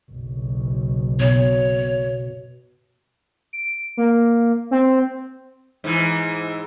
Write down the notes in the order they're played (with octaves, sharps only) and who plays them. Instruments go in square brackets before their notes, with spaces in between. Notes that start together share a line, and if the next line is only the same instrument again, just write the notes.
[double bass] F#1 B1
[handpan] B2 [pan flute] C#5
[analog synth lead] D7
A#3
C4
[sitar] G#2 E3